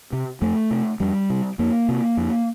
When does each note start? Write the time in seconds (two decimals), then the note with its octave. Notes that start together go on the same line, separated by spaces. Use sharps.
0.13 C3
0.42 F2 A3
0.71 C3
1.00 F2 G3
1.30 C3
1.59 F2 A#3
1.89 C3
2.17 F2